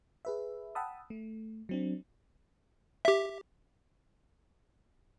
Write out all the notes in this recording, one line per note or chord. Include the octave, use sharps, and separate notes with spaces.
G#4 B4 E5
F#5 G5 A5 B5 D#6 E6
A3
F#3 C4 D4
G4 E5